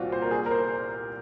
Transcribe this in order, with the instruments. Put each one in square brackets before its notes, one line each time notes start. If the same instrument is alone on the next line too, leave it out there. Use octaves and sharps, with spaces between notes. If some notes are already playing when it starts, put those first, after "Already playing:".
Already playing: [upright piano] C2 A#2 C4 [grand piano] F4 F#4
[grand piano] C5
A#4
G#4
A#4
C5